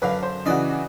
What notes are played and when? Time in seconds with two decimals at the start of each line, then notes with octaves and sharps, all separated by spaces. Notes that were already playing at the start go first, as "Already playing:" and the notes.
0.02 F#2 D3 B4 F5
0.23 C5
0.46 C#3 E3 F#4 D5 D#5